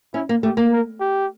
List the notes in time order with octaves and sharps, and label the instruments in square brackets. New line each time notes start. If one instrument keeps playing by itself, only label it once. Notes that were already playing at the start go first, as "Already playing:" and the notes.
[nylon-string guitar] C#4 [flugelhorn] E4
[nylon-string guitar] A#3
[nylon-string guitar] A3 [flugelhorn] G4
[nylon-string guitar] A#3
[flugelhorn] A#4
G4